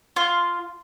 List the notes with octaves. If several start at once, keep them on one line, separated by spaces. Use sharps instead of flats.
F4